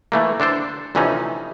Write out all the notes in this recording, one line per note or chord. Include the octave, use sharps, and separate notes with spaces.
E3 A3 A#3
D3 D4 A4 C5
D2 C3 E3 F3 C#4 D#4